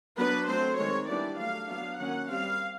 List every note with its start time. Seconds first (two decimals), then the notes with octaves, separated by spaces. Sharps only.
0.18 F#3 B3 D4 B4
0.48 F#3 A3 C4 C5
0.78 D#3 G#3 C4 C#5
1.08 E3 G3 B3 D4 D5
1.38 F#3 A3 D4 F5
1.69 F#3 B3 D4 F5
1.99 D#3 F#3 A#3 C#4 F#5
2.29 G3 C4 F5